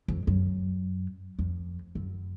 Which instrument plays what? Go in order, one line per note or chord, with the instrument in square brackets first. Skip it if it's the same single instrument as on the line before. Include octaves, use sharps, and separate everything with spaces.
[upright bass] F2
F#2
F2
F#2